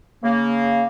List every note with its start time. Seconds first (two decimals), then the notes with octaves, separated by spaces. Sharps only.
0.23 C#3 A#3